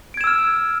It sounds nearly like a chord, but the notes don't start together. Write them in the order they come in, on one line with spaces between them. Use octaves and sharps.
D7 G#6 E7 E6 F6